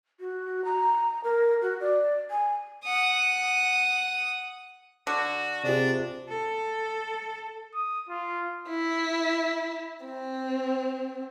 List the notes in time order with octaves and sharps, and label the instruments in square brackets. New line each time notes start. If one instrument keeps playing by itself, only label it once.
[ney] F#4
A#5
A#4
F#4
D5
G#5
[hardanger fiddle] F#5 D#6
[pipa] D3 [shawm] F#4
[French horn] C3 [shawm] D4 [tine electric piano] F4 G#4 D5
[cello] A4
[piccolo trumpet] D#6
F4
[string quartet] E4
C4